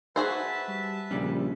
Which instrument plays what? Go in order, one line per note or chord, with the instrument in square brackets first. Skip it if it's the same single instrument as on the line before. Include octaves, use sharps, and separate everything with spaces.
[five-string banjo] F#4 G#4 C5 [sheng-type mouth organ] B4 E5 A5
[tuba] G3
[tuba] A#1 [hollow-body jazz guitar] C#3 G3 C#4